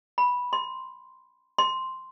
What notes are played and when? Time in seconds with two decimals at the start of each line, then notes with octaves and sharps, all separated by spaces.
0.18 B5
0.53 C6
1.58 C6